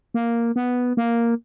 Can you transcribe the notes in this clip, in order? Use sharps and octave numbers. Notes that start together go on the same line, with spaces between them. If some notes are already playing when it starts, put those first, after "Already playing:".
A#3
B3
A#3